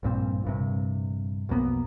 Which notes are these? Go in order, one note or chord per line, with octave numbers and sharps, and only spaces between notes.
A#1 G2 A#2 C4
A#1 G2 C3
B1 F2 A#3 B3